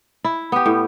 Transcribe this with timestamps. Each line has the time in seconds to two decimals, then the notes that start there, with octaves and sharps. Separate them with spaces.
0.24 E4
0.52 B3 G4
0.66 A2